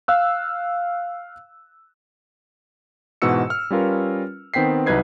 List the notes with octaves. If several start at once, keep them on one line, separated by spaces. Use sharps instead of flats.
F5 E6 F#6
G#2 B2 E3 F#4 E6 C#7
F6
G3 C#4 F4 A#4 B4
D#3 B3 C4 G5 B6 C7
C2 F#3 D#4 B4 G#6 C7